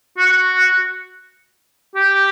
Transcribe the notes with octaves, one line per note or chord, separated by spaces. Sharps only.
F#4
G4